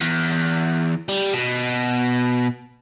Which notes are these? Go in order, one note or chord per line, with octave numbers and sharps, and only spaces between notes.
E2
G3
B2